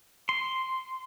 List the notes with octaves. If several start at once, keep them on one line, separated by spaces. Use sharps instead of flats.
C6